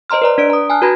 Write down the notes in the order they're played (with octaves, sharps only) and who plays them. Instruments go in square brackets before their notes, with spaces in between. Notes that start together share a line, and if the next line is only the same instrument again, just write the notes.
[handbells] C5 D#5 A#5 C6 F6
B4 D5 A#5
D4 D5 D7
A#5 D#6
G#5 A5 F6 F#6
F#4 B4 A#5 B5 G#6 A#6